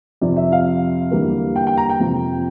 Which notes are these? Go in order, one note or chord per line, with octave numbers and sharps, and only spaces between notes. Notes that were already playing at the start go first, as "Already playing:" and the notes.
F2 C3 F3 D5
E5
F5
E2 D3 G3 A#3
G5
G5
A#5
G5
F2 C3 F3